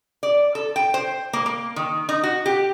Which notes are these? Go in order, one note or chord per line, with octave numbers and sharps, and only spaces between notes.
D5
A4
G5
C5
A#3
A#3
D#3
D#4
F#4
G4